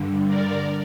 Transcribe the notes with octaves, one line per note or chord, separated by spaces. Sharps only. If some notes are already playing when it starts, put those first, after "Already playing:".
Already playing: G2 D3
A#4 D5